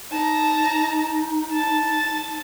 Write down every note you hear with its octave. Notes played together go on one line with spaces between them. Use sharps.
D#4 A5 A#5
A5 A6